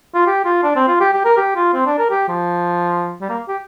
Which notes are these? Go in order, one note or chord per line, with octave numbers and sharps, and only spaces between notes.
F4
G4
F4
D4
C4
F4
G4
G4
A#4
G4
F4
C4
D4
A#4
G4
F3
G3
A#3
G4